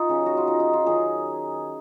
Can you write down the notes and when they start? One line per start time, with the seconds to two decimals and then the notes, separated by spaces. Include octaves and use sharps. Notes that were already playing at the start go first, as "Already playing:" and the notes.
Already playing: D#4 F4
0.09 C#3 F#3 C#4
0.26 F#4
0.37 F4
0.48 D#4
0.60 D#4
0.73 F4
0.86 D#3 F#3 C#4 G#4